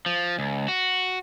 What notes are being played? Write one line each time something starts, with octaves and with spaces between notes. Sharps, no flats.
F3
C#2
F#4